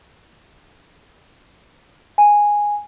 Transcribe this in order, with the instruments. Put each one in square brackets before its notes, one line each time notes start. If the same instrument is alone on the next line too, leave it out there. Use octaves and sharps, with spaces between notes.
[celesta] G#5